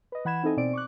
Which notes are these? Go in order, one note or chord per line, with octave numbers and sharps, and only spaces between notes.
B4 D#5
E3 F#5 B5 G#6 E7
C4 D#4 E4 A4 D#5 G#5
B2 C4 D5 D7
C#6 D6 F#6